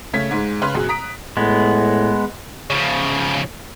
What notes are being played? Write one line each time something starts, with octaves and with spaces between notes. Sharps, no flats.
C#3 A3 C#5 G#6 B6
G#2 G#3
C#3 B4 C6 F6 F#6
F#2 B2 G#4
A#5 D#6 B6 D7
A2 G#3 B3
C#3 F3